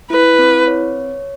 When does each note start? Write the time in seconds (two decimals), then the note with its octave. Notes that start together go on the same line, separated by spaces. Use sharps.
0.10 E4 B4
0.39 C4
0.68 C#5